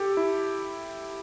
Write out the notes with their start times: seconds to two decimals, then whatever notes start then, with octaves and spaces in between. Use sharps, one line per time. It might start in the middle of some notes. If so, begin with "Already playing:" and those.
Already playing: G4 A4
0.17 E4